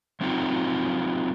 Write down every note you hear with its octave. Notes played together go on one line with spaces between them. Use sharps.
F#3 C4 C#4 D#4 F4 F#4